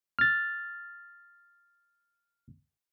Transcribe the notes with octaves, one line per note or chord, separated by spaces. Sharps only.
F6 A6